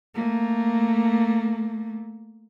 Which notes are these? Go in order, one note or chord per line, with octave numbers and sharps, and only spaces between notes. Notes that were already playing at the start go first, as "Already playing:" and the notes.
A3 A#3